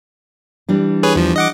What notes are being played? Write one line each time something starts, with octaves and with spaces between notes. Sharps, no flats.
E3 G3 D4
G#4 B4 C#5
E2 F3
D#5 F#5 D6